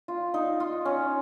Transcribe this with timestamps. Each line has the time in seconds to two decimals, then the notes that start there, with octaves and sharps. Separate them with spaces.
0.08 F4
0.34 D#4
0.60 F4
0.85 C#4